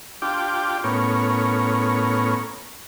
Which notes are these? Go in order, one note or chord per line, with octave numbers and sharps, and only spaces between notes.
D4 F4 G4 G5 D6
A2 B3 C#4 A#4 C#5